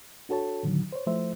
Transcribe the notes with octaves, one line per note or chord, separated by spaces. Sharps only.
D4 F#4 A4 C#5 A5
A2 D3 D#3 F#3
C5 C#5
F3 A3 E4 C5 E5